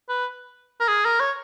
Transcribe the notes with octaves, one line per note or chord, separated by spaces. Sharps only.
B4
A#4
G#4
A#4
C#5